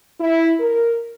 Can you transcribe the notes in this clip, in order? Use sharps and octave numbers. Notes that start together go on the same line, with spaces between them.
E4
A#4